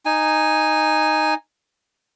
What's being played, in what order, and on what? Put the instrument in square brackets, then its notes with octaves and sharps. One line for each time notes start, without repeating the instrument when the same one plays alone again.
[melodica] D#4 G#5